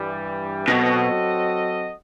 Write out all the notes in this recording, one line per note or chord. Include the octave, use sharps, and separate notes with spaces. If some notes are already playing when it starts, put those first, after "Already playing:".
Already playing: G2 E3 G3
B2 F#3 C4 F#4 A4 D#5